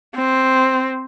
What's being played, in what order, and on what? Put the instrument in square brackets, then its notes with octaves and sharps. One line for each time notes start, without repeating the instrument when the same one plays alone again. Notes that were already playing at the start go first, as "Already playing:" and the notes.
[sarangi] C4